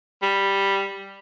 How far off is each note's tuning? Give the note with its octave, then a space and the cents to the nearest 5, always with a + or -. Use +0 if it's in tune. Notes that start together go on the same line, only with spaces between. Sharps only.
G3 +5